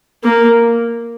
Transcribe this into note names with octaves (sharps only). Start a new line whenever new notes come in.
A#3